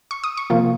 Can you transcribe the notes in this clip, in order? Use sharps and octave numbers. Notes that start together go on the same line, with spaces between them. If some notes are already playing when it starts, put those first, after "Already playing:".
C#6
D#6
C#6
C3 F3 A#3 F4